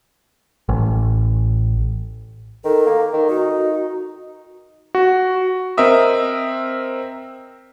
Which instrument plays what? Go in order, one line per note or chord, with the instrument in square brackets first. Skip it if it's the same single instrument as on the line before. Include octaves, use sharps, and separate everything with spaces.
[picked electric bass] A1
[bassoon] D#3 [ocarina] A4
[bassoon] A#3
D#3
[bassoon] D#4 [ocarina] F#4
[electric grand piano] F#4
C4 A#4 D#5 E5 D#6